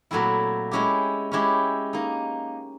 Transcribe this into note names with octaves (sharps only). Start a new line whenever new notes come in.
A#2 F#3 A3 C4 E4
G#3 C#4 E4 G4
G#3 C#4 E4 G4
A#3 D#4